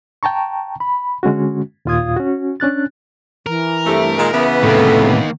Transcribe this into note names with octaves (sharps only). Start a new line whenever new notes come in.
G5 A5 A#5 C#6
B5
D3 G#3 C#4 F#4
D#2 A#2 F4 F5 D#6 G#6
C#4 F#4
C#4 D4 F#6 A6
E3 A#4
G2 C3 A3
A#2 D#3 G#3
C#3 E3 B3 E5
A2 C3 D#3 A#3 A4